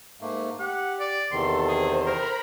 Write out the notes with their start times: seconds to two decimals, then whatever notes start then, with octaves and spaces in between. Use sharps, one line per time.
0.21 G#2 A3 A#3
0.59 G4 F#5
1.00 D5
1.31 E2 C3 D#3 A4 C6
1.68 G#4 C5
2.06 A#4 A#5 B5